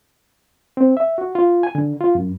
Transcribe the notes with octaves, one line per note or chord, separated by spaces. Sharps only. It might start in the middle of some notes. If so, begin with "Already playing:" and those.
C4
E5
F#4
F4
G#5
D3
F4
F#2